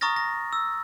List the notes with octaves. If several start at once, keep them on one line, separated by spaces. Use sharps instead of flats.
A#5 C#6 D#6 F6 A6 A#6
A#6
E6